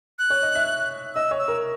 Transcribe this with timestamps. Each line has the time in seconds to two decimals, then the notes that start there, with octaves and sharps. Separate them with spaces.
0.19 F#6
0.30 C#5
0.42 D#5
0.55 E5
1.15 D#5 E6
1.31 C#5
1.39 E6
1.48 A#4